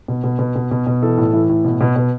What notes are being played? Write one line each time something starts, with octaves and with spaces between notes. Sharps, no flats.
B2
B2
B2
B2
B2
B2
E3 A4
A2
E3
A2
B2
B2
B2